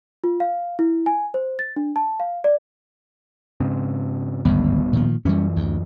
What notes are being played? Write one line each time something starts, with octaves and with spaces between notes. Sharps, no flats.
F4
F5
E4
G#5
C5
A6
D4
A5
F5
D5
G#2 C#3 C4
D1 G#1 D2 G2 G3 B3
A#2 D#3 F3
F#2 E3 G3 C#4
D2